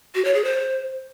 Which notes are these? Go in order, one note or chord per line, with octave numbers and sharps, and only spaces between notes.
F#4
C#5
G#4
C5